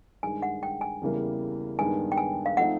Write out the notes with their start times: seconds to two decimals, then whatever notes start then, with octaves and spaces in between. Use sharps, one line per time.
0.23 G2 D#3 G#3 G#5
0.42 F#5
0.63 G5
0.81 G#5
1.01 E2 C#3 E3 G3 A#3
1.79 G2 D#3 G#3 B3 G#5
2.12 G5
2.18 G#5
2.46 F5
2.57 F3 A3 C4 D#4 F#5